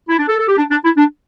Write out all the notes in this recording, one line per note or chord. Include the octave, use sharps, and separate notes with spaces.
E4
D4
A4
A4
G4
D4
D4
E4
D4